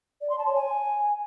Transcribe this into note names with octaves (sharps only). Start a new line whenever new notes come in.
D5
C6
A5
C#5
G#5